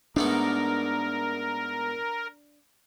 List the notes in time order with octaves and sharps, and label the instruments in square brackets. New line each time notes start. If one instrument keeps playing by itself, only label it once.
[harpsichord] G#2 A3 B3 [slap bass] D4 [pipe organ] A#4